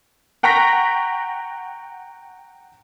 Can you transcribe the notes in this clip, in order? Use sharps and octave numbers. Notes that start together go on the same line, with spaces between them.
F#5 G5 A#5 C#6 A#6 B6